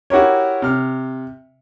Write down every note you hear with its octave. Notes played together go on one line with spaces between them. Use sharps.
E4 F#4 G4 A#4 C#5
C3 F6